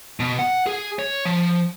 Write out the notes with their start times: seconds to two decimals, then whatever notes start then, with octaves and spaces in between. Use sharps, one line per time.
0.20 B2
0.39 F#5
0.66 G#4
0.99 C#5
1.25 F3